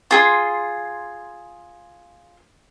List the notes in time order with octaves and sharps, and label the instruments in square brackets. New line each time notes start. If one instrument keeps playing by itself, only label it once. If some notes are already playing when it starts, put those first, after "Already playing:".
[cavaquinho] F4 G#4 C6